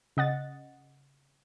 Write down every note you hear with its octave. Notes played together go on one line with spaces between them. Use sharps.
C#3 D#5 F#5 A6